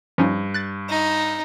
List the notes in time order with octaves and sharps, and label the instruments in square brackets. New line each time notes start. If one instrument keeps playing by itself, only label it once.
[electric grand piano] G2 [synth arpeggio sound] F3 C#4 D#4
[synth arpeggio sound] F#6 A6
[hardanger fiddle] D#4